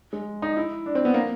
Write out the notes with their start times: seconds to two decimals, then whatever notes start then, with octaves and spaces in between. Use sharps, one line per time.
0.13 G#3
0.42 D#4
0.57 E4
0.86 D4
0.95 C4
1.05 B3
1.14 A#3